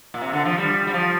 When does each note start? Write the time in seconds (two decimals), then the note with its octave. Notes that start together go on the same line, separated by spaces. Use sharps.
0.14 A#2
0.21 C3
0.33 D3
0.45 F3
0.58 G3
0.87 G3
0.94 F3